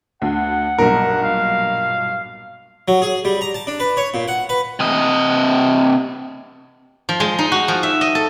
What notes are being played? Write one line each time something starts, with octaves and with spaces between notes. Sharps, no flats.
D2 F#5
B1 G2 A#2 A#4
F5
F#3
G#4
G3
A#5
A5
D4
B4
C#5
A#2
F#5
B4
C3 D#5
F3
G#3
D#4
F#4
F3
E5
D#5
A4